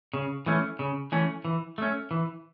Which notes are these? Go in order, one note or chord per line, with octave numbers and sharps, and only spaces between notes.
C#3
E3 A3 C#4
C#3
E3 A3 C#4
E3
A3 C#4
E3